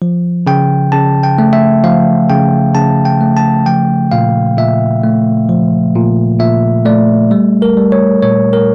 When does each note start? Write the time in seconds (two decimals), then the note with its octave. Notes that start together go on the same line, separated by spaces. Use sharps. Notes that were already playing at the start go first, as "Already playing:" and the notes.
0.02 F3
0.47 C#3 G5
0.92 C#3 A5
1.23 G5
1.38 A3
1.53 E5
1.84 F3 F5
2.29 C#3 G5
2.75 C#3 A5
3.05 G5
3.21 A3
3.37 A5
3.66 F3 G5
4.11 A#2 F5
4.57 A#2 E5
5.03 A3
5.49 F3
5.95 A#2
6.40 A#2 E5
6.85 A3 D5
7.31 G3
7.62 A#4
7.77 G3
7.92 C#5
8.22 A#2 C#5
8.53 A#4